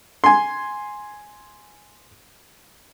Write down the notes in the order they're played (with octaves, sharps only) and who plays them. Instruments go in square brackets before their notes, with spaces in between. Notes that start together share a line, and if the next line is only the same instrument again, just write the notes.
[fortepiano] G#5 C6